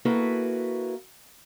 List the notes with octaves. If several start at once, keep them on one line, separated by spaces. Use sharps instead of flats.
A#3 E4 F#4 A4 B4